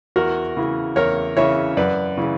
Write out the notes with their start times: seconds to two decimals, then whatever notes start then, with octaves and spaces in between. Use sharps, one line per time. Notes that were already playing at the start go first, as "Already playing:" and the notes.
0.16 E2 F#4 A#4
0.57 C#3 E3
0.96 E2 A#4 C#5
1.37 C#3 E3 C#5 E5
1.77 F#2 B4 D5
2.18 C#3 E3